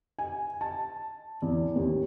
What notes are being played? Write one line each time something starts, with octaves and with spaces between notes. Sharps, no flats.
G#5
A5
E2
D#2